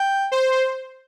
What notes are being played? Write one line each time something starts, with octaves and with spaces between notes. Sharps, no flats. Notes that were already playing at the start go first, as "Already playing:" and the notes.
Already playing: G5
C5